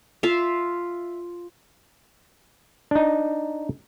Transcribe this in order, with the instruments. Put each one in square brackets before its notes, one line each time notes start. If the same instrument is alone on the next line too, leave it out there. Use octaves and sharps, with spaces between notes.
[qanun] F4 E5 F5
[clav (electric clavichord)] D4 D#4